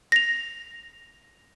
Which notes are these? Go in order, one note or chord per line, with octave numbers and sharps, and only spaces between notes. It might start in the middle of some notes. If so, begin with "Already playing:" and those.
A#6 F7